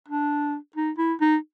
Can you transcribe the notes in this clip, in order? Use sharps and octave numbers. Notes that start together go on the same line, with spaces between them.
D4
D#4
E4
D#4